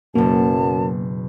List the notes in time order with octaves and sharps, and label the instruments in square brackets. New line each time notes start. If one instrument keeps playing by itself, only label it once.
[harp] F#1 B2 [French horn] F#2 [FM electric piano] A#3 [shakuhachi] A5